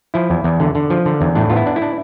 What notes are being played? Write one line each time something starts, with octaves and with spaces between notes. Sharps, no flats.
F3 E4
E2
E2
D3
D3
F3
D3
E2
A2 D4
B3 F4
E4
D4
E4
D4